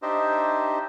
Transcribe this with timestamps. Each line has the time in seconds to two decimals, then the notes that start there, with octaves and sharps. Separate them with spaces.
0.02 D4 D#4 G4 C5 D#5 E5